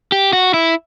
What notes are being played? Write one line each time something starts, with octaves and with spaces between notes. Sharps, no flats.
G4
F#4
E4